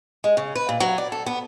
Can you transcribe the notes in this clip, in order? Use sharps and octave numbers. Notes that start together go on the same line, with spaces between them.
G#3
C#3
B4
A#2
F#3
D5
A4
B3